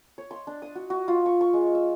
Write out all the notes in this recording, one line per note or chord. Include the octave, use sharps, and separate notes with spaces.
C#5
C6
D4
D#6
F#4
F#4
F4
C#6
C#6
G#3
E6